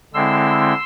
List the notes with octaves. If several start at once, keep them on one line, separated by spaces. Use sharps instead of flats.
D3 G#3 C4 E4 C6 E6